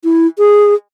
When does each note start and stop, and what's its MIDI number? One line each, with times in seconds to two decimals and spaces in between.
0.04 0.27 64
0.38 0.74 68